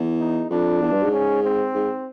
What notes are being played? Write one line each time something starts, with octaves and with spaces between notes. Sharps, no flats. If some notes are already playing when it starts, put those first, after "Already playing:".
Already playing: E2
D#4
F2 D4
E2
G2
G#2
C#4
C4
G#2